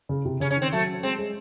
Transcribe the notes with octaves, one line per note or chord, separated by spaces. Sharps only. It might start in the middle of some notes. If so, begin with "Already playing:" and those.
C#3
C3
C#3 C#4
C#4
D#3
C4
F#3 A3
G#3 C4
G#3